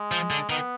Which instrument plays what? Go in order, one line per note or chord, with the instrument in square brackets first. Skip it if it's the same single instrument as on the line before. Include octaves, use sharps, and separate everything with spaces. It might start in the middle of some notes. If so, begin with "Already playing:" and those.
Already playing: [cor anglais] G#3
[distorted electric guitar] F3
D3
[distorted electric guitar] D#3 [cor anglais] B3